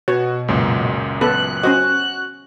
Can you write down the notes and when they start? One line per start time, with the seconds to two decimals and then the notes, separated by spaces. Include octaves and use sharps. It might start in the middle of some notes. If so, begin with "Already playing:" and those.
0.08 B2 F#4 C#5
0.48 C#2 F#2 A#2
1.21 B3 A4 B4 F#6
1.63 C#4 F#4 C5 D#5